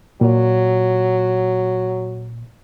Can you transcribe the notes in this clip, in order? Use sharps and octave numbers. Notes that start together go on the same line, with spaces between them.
A#2 F#3